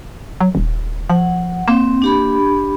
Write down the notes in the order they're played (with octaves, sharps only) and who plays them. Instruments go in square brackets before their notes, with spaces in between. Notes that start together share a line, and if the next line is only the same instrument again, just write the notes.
[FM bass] F#3
D#1
[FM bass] F3 [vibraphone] F#5
[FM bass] A#3 [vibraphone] C4
[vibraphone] D4 G4 B5